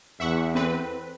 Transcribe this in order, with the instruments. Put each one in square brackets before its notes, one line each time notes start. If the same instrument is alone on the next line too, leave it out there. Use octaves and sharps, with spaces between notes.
[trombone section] E2 [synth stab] E5 F#5 C#6
[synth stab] C4 A4 B4